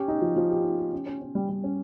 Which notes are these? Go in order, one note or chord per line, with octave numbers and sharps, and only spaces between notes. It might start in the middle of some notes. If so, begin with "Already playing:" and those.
Already playing: C#4 G4
D#4
F3
F3
G4
D#4
G4
C#4
C#4
C#4
G3
G3
C#4